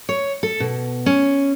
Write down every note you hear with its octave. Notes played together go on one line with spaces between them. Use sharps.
C#5
A4
B2
C#4